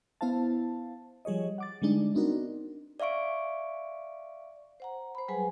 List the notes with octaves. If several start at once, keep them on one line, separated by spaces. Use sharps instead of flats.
B3 E4 C5 F5 A5
F3 G3 G#4 C#5 D#5
F#5 D6 A6
D3 G3 G#3 D4 D#4
B3 C4 D4 D#4 F#4 A#4
D5 E5 F5 C#6 D7
C5 F#5 A#5
C5 B5
F#3 G3 G#4 B4 F#5 G#5